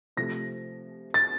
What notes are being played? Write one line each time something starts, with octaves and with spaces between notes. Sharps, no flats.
C3 F3 A3 A#6
A6